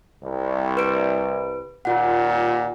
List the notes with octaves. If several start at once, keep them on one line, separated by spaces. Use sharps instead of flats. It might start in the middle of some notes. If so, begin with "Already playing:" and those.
C2
B4 D7
D#2 A#2 F4 F#5